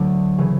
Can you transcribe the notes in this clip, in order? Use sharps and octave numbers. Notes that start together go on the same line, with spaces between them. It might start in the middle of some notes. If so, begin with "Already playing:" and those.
Already playing: D2 D3 F#3 A3 B3 D4
C#3 E3